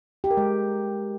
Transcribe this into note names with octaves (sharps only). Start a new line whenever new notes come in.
G4
A#4
G#3